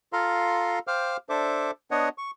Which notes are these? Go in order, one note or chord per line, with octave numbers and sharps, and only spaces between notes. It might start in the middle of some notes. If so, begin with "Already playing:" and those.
F4 A4 F5 A#5 C6
C5 F5 G5 D6 F6
D4 A4 C5 E5 D6
B3 D4 C#5 D#5 F#5
C#6